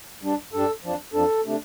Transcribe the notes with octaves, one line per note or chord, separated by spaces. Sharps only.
G2 G3 D4
G2 G3 D4 A4
F2 F3 D4
F2 F3 D4 A4
C3 A3 D4